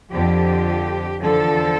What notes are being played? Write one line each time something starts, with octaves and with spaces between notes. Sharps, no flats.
F2 D3 F3 G4
E2 D3 F3 A4